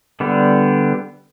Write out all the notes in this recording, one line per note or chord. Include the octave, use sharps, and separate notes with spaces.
D3 G3 B3